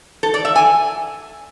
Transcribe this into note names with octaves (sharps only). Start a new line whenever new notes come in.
A4
D5
E5
G#5